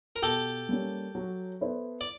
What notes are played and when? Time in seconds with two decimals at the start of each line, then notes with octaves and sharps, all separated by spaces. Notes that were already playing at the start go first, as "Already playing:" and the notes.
0.16 A#4
0.23 B2 G4 A4
0.69 G3 A#3 C#4
1.15 F#3
1.61 B3 E4 A4 C5
2.01 D5